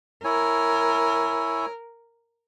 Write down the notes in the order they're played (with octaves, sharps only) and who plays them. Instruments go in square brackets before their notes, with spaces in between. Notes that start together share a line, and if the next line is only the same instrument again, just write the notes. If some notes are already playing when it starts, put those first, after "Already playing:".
[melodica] E4 C#5 G#5 [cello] A#4